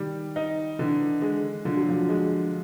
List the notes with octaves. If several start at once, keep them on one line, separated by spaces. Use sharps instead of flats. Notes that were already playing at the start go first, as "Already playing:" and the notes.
Already playing: D#3 G3
D#4
D3 E3
G#3
D3 F3
F#3
F3
G#3